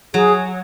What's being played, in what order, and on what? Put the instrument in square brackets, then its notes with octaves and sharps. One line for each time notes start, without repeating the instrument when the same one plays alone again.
[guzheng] F#3 [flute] G#4